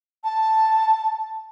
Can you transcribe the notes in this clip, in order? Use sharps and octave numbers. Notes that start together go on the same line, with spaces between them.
A5